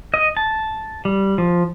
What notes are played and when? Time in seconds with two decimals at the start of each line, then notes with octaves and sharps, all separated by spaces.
0.14 D#5
0.37 A5
1.05 G3
1.38 F3